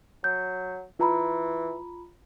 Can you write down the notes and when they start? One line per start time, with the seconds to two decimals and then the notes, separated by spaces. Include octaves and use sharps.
0.24 F#3 G6
1.00 E3 F4 A#5 B5